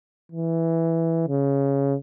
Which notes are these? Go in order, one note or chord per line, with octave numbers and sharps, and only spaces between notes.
E3
C#3